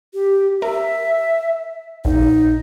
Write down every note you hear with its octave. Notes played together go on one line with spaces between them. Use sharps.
G4
A#4 E5
A#1 D#4